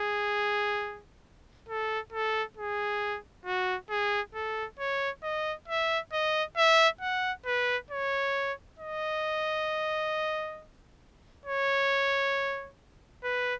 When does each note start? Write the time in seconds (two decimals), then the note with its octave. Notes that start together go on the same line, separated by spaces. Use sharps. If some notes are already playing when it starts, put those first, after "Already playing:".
Already playing: G#4
1.69 A4
2.12 A4
2.57 G#4
3.46 F#4
3.90 G#4
4.35 A4
4.79 C#5
5.23 D#5
5.68 E5
6.13 D#5
6.57 E5
7.01 F#5
7.46 B4
7.91 C#5
8.79 D#5
11.46 C#5
13.24 B4